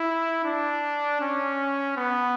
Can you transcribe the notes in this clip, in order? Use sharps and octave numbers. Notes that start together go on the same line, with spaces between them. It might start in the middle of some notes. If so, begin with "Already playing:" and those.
Already playing: E4
D4
C#4
B3